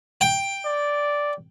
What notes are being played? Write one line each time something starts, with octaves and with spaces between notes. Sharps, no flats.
G5
D5